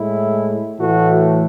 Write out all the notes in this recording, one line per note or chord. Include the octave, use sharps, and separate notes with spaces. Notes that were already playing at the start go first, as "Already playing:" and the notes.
Already playing: A2 G#3 E4
A2 E3 A3 F#4